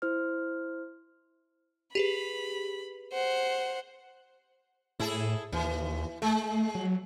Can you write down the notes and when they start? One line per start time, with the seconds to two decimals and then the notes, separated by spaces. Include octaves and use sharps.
0.02 E4 C5 F6
1.95 G4 G#4 B4 B5
3.12 C5 F#5
5.00 A2 E4 G#4 A4
5.52 D#2 E3
6.22 G#3 A3
6.75 F#3